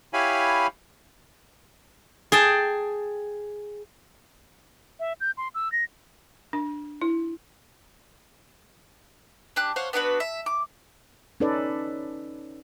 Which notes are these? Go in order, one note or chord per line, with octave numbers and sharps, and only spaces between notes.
E4 G4 C#5 F5 G#5 B5
G#4 G5 A5
E5
G6
C6
E6
A#6
D4
E4
D4 G4 F#6
C5 C#5 F5 F#5
B3 D4 F#4 B4
E5
D6
C#4 D#4 A4 B4 D5